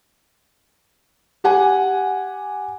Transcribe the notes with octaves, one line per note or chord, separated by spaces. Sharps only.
G4 F#5 G#5